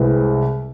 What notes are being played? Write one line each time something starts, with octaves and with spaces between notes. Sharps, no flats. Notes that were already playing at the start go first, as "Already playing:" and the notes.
Already playing: C2 C3 G#3 C4 B4